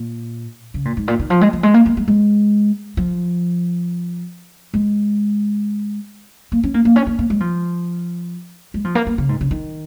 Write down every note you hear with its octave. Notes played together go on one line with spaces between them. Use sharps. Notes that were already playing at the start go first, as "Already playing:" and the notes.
Already playing: A#2
C#3
A#2
G#2
A#2
D#3
F3
G#3
F3
G#3
A#3
A#3
G#3
G#3
F3
G#3
A#3
C#4
A#3
A#3
C#4
A#3
A#3
G#3
F3
G#3
F3
A#3
A#3
C#3
G#2
C#3
D#3